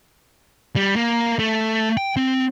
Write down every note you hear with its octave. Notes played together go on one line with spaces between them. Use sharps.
G3
A#3
A3
G5
C4